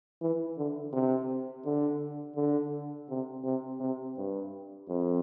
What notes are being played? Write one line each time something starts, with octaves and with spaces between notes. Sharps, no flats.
E3
D3
C3
D3
D3
C3
C3
C3
G2
F2